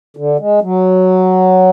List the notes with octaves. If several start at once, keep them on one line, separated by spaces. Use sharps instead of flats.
D3
G#3
F#3